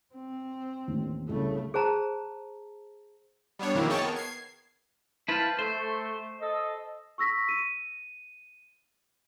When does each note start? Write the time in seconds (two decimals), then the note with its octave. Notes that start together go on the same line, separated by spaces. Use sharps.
0.14 C4
0.88 A1 D#2
1.29 C2 C#3 A3
1.74 G#4 C5 A5 A#5
3.59 G3 B3 D4 C#5
3.75 F2 B2 D#3 A#3 C4 E4
3.89 G#4 C#5 D#5 G5 A5 C#6
4.01 B3 A#4
4.16 G#6 C7
5.28 E4 B4 C5 F5 A5
5.59 A3 C5
6.40 A4 D#5
7.18 C#6 E6 A#6 B6
7.49 D#7